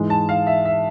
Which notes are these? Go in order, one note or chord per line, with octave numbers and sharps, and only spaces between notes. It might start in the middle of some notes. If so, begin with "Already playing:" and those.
Already playing: G#2 E3 G#3
A5
F5
E5
E5